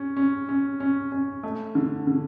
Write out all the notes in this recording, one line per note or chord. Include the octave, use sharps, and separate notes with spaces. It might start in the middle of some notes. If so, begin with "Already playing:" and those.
Already playing: C#4
C#4
C#4
C#4
C#4
A3
D3
D3